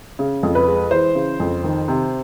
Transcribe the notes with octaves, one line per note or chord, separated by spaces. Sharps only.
C#3
F2
B4
G#3
E3 C5
C#3
F2
D#3
C3